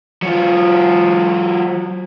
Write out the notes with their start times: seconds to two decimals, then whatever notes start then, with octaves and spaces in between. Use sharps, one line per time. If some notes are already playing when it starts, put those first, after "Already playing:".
0.22 F#3 F4